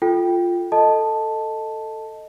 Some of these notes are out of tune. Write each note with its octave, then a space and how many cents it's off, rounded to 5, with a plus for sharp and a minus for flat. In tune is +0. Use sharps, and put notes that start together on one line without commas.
F4 +0 A4 -10 G5 +0
A4 +10 D#5 +0 A5 +0